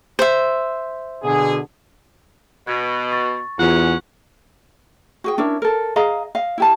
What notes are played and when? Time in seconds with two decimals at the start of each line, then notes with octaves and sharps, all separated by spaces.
0.19 C5 E5
1.24 B2 D3 G#4
2.67 B2 F#6 G#6
3.12 C#6 A6
3.59 E2 G#2 C#4 F4 F#5
5.24 F#4 G#4 G5
5.38 C#4 D4 E4 A#4
5.62 A4 A#4
5.96 G#4 D#5 F5 A#5
6.35 D#5 F5
6.58 E4 G4 A5